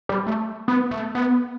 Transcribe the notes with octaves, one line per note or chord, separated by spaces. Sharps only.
G3
A3
B3
A3
B3